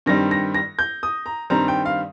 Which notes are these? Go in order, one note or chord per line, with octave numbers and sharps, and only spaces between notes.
G2 D#3 G3 C4 A#6
A#6
A#6
G6
D#6
A#5
G2 D#3 G3 C4 A#5
G5
F5